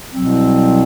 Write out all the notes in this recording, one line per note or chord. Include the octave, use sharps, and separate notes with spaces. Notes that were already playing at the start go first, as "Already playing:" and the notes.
C2 B2 F#3 C4